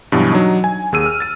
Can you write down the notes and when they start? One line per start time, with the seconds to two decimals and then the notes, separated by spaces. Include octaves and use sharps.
0.12 G2 B2 E3 F#3 G3
0.32 F#3 D4 D#4
0.64 G#5
0.93 D#2 G#4 E6 D#7
1.06 F6
1.20 A6 D#7